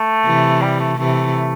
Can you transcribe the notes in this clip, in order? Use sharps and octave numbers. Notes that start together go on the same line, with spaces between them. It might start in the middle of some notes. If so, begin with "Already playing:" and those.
Already playing: A3
C3 E3
G3
A3
C3 E3 A3